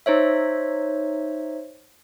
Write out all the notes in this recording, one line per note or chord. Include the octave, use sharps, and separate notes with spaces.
D#4 C5 C#5 E5